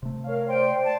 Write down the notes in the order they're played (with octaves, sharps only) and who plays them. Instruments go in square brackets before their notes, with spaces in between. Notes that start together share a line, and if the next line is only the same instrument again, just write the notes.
[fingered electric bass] C3 A3
[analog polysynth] A#4 C#5 F5
[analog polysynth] C5 D5 C6 [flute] G5
[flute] A5